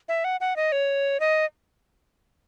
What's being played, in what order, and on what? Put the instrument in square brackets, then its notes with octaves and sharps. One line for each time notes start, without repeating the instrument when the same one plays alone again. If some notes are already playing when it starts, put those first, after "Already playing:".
[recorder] E5
F#5
F#5
D#5
C#5
D#5